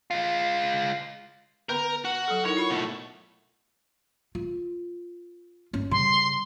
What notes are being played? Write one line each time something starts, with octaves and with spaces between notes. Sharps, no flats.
G#3 F4
D3 B3 A#4 B4
F#4 F#5
F#3 A4
D#4 E4 A#4 C#5
F4 B5
B2 A3
F4
G1 C#4
C#3 G3 C6